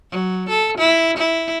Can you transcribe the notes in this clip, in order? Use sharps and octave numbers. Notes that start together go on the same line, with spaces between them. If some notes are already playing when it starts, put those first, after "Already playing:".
F#3
A4
E4
E4